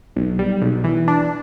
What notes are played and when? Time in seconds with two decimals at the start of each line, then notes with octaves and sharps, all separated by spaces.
0.16 B1
0.39 G3
0.61 B1
0.84 E3
1.08 D4